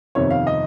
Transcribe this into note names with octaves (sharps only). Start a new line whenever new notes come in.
G1 F2 C3 D#3 C#5
F5
D#5